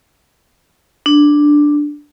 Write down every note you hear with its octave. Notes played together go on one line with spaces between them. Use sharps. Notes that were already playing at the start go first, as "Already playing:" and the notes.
D4